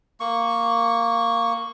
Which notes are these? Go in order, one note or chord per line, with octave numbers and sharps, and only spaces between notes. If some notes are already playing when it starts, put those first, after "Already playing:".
A#3 C#6